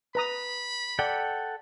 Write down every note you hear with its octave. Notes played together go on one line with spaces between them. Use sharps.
B4 A#5 B5 D#6
A4 D5 F#5 G5